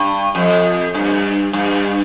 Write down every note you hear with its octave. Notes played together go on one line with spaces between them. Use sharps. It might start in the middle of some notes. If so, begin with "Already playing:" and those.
Already playing: G2
F2
G2
G2